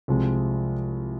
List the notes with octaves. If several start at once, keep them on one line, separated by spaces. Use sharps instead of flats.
C2 C3 F3 G#3